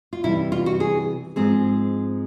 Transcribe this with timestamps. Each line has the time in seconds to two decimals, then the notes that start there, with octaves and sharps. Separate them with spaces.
0.13 F4
0.23 C3 E3 G3 E4
0.52 F4
0.66 F#4
0.80 G#4
1.36 G#2 F3 G#3 C4 G#4